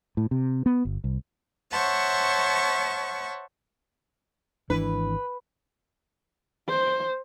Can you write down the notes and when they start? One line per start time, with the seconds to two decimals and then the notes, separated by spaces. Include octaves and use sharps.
0.17 A2
0.31 C3
0.66 B3
0.85 G1
1.04 C2
1.72 C5 C#5 E5 F#5 A5 C#6
4.70 G#1 E3 D4 B4
6.68 C5